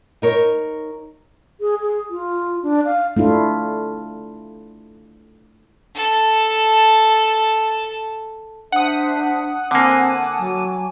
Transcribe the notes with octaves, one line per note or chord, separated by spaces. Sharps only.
D#4 A#4 C#5
G#4
G#4
F4
D4
F5
A3 D4 E4 F4
A4 A5
D4 C5 E5 F#5 D#6
D3 A#3 C4 G#5 A5 D6
F#3